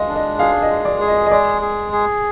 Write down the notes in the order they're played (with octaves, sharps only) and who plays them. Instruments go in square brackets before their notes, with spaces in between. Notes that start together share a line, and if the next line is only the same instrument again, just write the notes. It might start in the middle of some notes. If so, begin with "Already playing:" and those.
Already playing: [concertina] G#3 [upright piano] D#5 F5
[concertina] D4
[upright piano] D#5
[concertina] G#4 [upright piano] F5
[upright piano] D#5
[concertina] G#3
[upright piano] D5
[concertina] G#4
[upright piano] D#5
D#5
[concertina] G#3 [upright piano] D5
[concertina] G#4
G#4